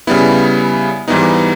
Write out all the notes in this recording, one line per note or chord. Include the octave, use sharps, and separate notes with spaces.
C#3 G3 B3 E4
G#2 E3 G3 B3 D#4